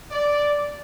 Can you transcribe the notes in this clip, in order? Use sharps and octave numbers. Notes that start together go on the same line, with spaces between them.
D5